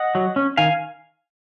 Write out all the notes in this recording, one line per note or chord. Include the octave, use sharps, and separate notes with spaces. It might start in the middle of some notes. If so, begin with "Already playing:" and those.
Already playing: D#5 F#5
F#3
C#4
D#3 F5 G#5